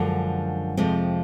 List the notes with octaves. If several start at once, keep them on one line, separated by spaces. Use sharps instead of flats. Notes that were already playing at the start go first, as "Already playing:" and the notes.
Already playing: F#2 D3 F3 G#3
F2 C3 F3 G#3 C4